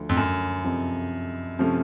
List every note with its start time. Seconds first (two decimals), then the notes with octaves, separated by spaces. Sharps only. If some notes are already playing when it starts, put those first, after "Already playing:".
Already playing: D2 D3 F3
0.09 F2
0.17 F#2
0.64 F2 C3 F3
1.59 C3 F3 A3 C#4